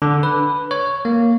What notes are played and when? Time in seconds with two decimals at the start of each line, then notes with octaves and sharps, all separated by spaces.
0.02 D3
0.23 B4
0.71 C#5
1.05 A#3